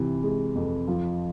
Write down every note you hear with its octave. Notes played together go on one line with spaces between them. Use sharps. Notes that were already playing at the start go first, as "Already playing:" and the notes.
Already playing: C3 E3
G#3
F2
F3